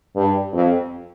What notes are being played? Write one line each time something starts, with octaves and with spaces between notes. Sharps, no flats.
G2
F2